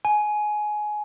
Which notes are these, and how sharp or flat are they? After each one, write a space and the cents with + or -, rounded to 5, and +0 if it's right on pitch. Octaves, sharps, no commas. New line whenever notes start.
G#5 +20